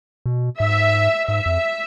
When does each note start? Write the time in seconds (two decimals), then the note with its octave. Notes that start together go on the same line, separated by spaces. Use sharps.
0.26 B2
0.60 G#2 E5
1.28 G#2 E5
1.46 F2